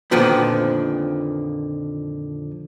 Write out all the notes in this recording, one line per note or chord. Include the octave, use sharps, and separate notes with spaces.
F2 A#2 D3 D#3 F3 B3